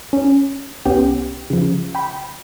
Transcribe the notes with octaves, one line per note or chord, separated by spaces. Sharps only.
C#4
C2 B3 C#4 G4 G5
C#3 F3
G5 B5 C6